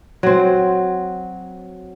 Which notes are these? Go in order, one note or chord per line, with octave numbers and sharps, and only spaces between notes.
F#3 C4